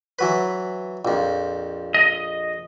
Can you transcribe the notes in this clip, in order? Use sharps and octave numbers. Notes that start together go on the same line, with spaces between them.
E3 F#3 B4
A#1 F2
D#5